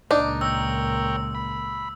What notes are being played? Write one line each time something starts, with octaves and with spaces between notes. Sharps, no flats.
C#2 A#2 D4 D#4
A#4 C#5 G5 E6
B5